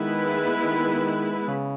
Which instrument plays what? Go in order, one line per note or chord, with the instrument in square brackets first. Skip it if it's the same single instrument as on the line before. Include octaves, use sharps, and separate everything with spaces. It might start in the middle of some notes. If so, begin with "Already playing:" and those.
Already playing: [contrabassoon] D#3 [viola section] G#3 B3 E4 B4
[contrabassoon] D#3
C#3